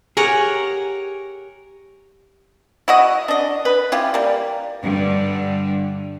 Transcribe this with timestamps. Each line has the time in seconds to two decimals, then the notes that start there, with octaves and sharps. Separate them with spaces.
0.17 G4 G#4 A#4 C#5 F#5
2.88 E4 F#4 D#5
3.28 D4 D#5
3.65 B4
3.92 E4 F4 G4
4.14 G3 A#3
4.82 G2 D3